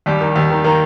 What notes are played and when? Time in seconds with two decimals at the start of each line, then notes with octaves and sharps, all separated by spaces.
0.06 D#2 G3
0.21 D#3
0.36 D#2
0.50 D#3
0.64 D#3 A#3